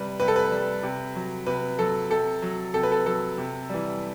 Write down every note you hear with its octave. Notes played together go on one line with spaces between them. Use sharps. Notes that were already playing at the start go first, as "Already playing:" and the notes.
Already playing: C3 G3 B4
C3 B4
A4
B4
G3
C3
F#3
C3 B4
F#3 A4
C3 A4
F#3
C3 A4
B4
A4
F#3 A4
C3
E3 G3